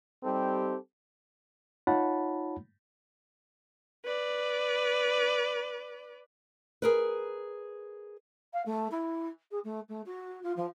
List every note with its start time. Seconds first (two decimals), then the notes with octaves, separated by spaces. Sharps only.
0.23 G3 C4 D#4 G4 A4
1.87 D#4 F4 C#5 F#5 A5 B5
4.05 B4 D5
6.82 G#4 A#4 B4
8.53 F5
8.66 A3
8.91 E4
9.51 G#4
9.64 A3
9.89 A3
10.06 F#4
10.43 F4
10.57 F3